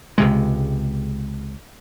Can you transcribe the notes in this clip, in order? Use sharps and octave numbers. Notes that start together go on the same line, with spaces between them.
C#2 C3 G#3